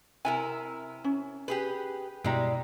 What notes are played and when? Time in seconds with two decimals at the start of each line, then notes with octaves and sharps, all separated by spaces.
0.25 C3 E4 A#4 G#5
1.04 C#4
1.48 G4 G#4 B4
2.24 G2 B2 G3 G#3 E4 G5 A#5